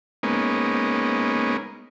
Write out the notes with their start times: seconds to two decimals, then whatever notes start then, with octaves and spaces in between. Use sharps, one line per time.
0.23 G#3 A#3 B3 C#4 D#4